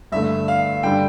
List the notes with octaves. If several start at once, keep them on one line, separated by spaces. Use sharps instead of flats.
G2 D3 A3 E5
F5
G2 D3 G3 D4 G5